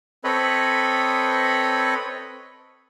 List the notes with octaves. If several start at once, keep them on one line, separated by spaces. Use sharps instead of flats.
C4 A4 B4 C#5 D#5 B5